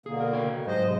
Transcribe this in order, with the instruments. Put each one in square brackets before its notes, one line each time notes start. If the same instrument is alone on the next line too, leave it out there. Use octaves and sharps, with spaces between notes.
[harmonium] B2 D3 A#3 [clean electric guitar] G#4
[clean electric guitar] A#4
F#4 C#5 G5
[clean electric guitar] G#2 F#3 G4 [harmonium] C5 D#5
[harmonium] C3 G#3